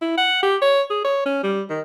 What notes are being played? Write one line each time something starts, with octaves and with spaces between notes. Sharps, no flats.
E4
F#5
G4
C#5
G#4
C#5
C#4
G3
D#3